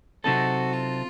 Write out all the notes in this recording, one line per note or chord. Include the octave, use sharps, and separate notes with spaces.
C3 F#3 C4 D#4 F#4 A4
F4